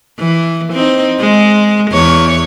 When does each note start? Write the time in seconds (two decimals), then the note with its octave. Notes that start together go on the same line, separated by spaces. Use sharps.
0.19 E3
0.73 C4 D#4
1.20 G#3
1.92 E2 C#5